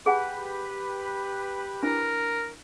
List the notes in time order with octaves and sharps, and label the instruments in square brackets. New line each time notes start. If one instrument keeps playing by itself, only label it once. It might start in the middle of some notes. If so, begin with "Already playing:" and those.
[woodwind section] G4 B4 [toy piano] G#4 F#5 G#5
[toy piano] D4 E4 [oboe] A#4